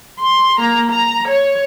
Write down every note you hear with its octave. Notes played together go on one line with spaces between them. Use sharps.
C6
A#3 A#5
A#5
C#5